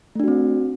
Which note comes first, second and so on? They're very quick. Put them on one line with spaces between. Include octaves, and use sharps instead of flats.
A3 D4 F#4 C4